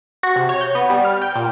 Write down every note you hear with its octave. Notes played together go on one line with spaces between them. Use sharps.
F#4
C3
C#5
G6
B3
G3
F6
G5
A#2